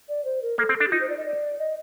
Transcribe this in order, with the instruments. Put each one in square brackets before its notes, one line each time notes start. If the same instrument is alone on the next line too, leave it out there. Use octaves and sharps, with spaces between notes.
[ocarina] D5
C5
A#4
[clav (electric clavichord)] A#3 [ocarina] A4
[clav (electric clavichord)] C4
[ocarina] A4
[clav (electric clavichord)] D4
[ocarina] G4
[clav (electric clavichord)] D#4 [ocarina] F4
[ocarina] C5
D5
D#5
D5
D#5